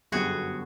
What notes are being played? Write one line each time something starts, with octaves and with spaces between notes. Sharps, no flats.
G1 F#2 D3 G3 B3 F#4 G#4